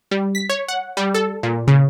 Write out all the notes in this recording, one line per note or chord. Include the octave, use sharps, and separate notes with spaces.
G3
B6
C#5
F#5
G3
A4
A#2
C#3